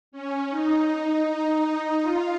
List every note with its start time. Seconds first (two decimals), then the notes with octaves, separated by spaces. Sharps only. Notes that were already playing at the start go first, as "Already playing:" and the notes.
0.12 C#4
0.50 D#4
1.27 D#4
2.02 F4